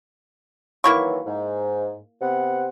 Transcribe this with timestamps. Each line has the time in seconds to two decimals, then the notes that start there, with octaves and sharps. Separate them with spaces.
0.84 D#3 E3 F#3 A#3 E4 C#6
1.26 G#2
2.21 C3 B3 F#5